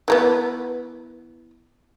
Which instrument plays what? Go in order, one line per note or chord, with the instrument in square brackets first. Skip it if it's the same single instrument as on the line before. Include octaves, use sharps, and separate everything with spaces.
[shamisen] E3 A#3 B3